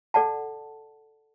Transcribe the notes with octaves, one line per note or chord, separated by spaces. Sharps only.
A4 D5 F#5 A5